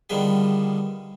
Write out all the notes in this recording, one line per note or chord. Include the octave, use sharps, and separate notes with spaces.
D3 D#3 F3 G3 B3 G#4